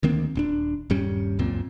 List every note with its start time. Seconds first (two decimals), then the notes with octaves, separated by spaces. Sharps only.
0.03 D2 D#3 A#3 C4
0.35 D#1 C4 D4
0.90 D#1 G2 G3 C#4
1.39 C#2 F#2 A#2 C4